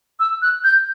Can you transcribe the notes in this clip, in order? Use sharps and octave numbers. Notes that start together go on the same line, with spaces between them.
E6
F#6
G6